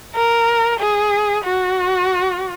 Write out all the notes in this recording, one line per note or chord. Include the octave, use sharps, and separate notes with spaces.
A#4
G#4
F#4